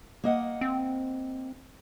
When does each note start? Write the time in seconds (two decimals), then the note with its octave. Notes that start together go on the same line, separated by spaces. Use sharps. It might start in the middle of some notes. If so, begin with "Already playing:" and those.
0.24 A#3 D#5 F#5
0.61 C4